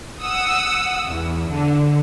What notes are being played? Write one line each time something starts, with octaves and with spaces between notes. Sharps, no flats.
F#5 D#6 E6
E2
D3